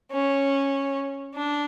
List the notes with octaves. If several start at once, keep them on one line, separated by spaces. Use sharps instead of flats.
C#4
D4